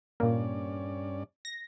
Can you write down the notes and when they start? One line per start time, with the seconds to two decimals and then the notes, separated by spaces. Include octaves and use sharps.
0.20 G2 A#2 A#3 C#4 D5
1.45 A#6